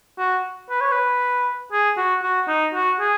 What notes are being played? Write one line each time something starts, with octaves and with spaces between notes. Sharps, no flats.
F#4
B4
C#5
B4
G#4
F#4
F#4
D#4
F#4
G#4